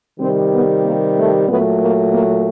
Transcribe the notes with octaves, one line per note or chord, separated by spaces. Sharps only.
C3 D#3 G3 C4
B3
A#3
A3
A#2 F#3 A3 B3
A#3
A#3